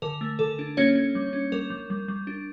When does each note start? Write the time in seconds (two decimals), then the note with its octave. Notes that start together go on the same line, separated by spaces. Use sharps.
0.02 D3 A#4
0.21 A3
0.39 D3 A4
0.59 D4
0.77 A#3 C#4 C#5
0.96 C#4
1.15 G3
1.33 C#4
1.52 G3 A#4
1.70 G3
1.90 G3
2.08 G3
2.27 D4